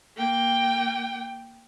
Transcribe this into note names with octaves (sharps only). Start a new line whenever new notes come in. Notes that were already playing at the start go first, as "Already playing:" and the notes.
A#3 G5